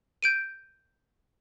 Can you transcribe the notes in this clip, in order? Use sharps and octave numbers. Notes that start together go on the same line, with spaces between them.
G6 D7 D#7